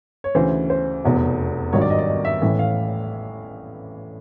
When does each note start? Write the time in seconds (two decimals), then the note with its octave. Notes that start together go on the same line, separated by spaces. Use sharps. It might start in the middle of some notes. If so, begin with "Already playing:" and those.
0.24 C#5
0.35 D2 C#3 E3 C5
0.70 C5
1.04 F1 E2 B2
1.73 G#1 G2 D#3 F#3 C#5
1.82 D5
1.90 D#5
1.99 D5
2.07 D#5
2.25 E5
2.42 A1 A2 E3 E5
2.59 F5